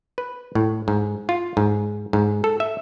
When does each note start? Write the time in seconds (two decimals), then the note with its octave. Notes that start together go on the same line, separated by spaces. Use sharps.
0.18 B4
0.55 A2
0.88 G#2
1.29 F4
1.57 G#2
2.13 G#2
2.44 A4
2.60 E5